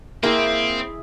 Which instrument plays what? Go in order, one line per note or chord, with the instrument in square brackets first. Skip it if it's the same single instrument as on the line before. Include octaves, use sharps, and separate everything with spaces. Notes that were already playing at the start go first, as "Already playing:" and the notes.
[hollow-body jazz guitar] A#3 [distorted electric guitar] C4 [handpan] E4 G#4 E5